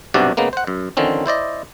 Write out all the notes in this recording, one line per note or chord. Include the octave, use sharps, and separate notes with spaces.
B1 G2 C3 F#4 D5
C#3 G#3 A#3 B3
C5 F#5
F#2
D3 D#3 F3 C4 C#4
E4 C5 D5 D#5